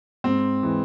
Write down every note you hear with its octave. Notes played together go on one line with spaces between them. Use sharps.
G#2 C4
E3 G#3